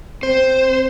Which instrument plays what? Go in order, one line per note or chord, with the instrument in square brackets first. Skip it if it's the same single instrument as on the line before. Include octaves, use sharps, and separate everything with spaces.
[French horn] C4 [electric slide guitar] C5